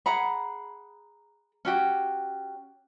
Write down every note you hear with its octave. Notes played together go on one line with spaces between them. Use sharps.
G#4 F#5 A#5 B5
C#4 F#4 G4